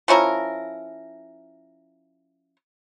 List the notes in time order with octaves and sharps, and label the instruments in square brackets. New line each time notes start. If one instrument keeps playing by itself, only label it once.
[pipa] F3 C#4 E4 A#4